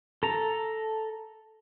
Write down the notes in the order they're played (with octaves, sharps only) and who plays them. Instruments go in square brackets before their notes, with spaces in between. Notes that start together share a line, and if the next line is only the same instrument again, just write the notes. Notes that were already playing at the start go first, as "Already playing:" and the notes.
[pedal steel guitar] A4 A#5